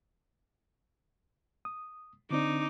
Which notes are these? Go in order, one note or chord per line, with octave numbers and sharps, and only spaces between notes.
D#6
D3 C4 D4 D#4 D6